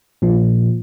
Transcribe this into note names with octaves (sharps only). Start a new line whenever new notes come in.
A#2 F3